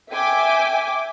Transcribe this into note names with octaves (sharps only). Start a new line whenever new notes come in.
E5 G5 G#5 D6